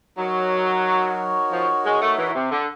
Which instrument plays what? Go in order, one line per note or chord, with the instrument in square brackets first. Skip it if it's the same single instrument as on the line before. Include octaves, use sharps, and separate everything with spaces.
[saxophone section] F#3 [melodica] D#4 F#4 A#4 C#5
[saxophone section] F3
G#3
A3
E3
C3
D3